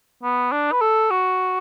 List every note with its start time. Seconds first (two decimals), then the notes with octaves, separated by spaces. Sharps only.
0.24 B3
0.52 D4
0.72 B4
0.81 A4
1.10 F#4